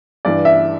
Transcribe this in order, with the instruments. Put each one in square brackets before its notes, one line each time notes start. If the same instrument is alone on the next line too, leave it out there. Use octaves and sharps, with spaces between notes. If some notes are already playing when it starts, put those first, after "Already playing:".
[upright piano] G2 E3 D5
E5